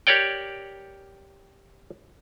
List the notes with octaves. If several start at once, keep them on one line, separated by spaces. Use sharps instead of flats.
G4 A#4 C#5 D5 G5